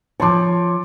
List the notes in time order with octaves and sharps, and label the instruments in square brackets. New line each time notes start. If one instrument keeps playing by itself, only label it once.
[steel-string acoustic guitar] F3 C#5 [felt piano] A5 C6 D6